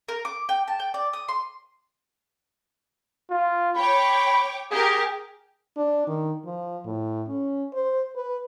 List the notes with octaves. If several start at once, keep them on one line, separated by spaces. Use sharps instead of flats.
A#4
D6
G5
A5
G5
D5
D#6
C6
F4
C#5 G5 B5 D6
G4 G#4 A#4
D4
D#3
F3
A2
C#4
C5
B4